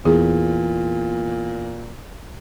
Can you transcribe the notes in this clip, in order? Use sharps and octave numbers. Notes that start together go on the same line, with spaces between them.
E2 A#2 G#4